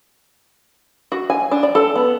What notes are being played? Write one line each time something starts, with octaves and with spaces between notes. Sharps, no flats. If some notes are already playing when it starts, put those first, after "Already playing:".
F#4
G#5
D4
D5
A4
B3